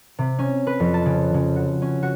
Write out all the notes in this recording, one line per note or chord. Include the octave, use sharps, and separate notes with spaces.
C3
C#4
B4
F2
A5
C#3
C#3
F#4
C#4
F#4